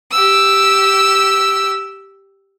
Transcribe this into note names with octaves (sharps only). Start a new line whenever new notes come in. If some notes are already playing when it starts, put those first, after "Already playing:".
G4 E6